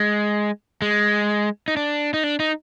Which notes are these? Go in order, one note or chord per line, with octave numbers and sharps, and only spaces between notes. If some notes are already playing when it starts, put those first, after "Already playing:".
Already playing: G#3
G#3
D#4
D4
D#4
D4
D#4